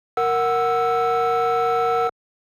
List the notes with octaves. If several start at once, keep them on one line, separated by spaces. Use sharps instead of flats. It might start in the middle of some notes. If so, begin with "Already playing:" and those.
A#4 F#5 E6